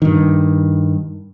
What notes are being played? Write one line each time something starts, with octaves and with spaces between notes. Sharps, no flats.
G2 D#3